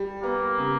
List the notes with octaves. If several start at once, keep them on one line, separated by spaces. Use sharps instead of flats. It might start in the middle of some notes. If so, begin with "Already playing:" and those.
Already playing: G3
A#3 B3
C#3